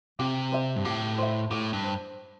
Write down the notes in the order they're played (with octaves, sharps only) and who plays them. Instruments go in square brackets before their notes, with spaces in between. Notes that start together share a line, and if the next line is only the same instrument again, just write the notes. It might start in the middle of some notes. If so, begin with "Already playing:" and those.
[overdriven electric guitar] C3 [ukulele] G4
[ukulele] C5 E5
[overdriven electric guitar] G2
[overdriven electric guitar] A2 [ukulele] G4
[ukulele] C5 E5
[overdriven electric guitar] A2 [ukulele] G4
[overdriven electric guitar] G2
[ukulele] C5